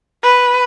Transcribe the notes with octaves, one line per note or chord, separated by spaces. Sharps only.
B4